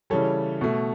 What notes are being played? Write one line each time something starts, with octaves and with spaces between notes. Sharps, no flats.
C#3 E3 G3 A4 C#5
B2 A3